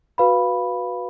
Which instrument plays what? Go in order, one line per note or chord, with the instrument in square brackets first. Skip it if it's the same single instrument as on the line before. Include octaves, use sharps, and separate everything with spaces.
[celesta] F#4 B4 F5 B5